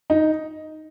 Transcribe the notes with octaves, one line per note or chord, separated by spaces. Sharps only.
D#4